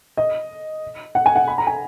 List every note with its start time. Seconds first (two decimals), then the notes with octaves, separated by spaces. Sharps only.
0.17 D#5
1.15 F#5
1.26 G#5
1.36 F#5
1.48 B5
1.58 A#5
1.67 G#5